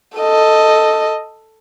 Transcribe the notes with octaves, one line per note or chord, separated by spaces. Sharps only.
A4 D#5